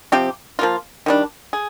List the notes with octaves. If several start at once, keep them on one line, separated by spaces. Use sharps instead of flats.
C3 F3 C4 G4
F3 A#3 F4
D#3 G3 D4
G#4